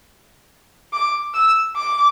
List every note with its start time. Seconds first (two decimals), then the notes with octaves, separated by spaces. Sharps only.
0.93 D6
1.34 E6
1.77 D6